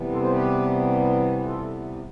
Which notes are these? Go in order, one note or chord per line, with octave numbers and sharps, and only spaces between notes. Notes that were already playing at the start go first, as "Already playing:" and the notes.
Already playing: C3 E3 G3 B3
A4 C5
C5
G4 B4
B4
F4 A4